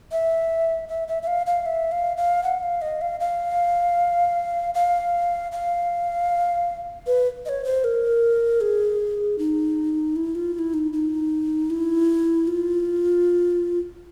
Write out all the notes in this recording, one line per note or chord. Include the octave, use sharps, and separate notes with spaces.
E5
E5
E5
E5
F5
F5
E5
F5
F5
F#5
F5
D#5
F5
F5
F5
F5
B4
D#5
C#5
C5
A#4
G#4
D#4
E4
F4
F4
E4
D#4
D#4
E4
F4